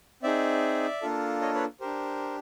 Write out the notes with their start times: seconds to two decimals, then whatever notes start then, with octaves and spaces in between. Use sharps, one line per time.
0.23 C4 D#4 G#4 D5 E5
1.02 A#3 D4 F4 A4
1.41 C#5 D#5
1.54 B4 C#5
1.80 D4 G4 A#4 C5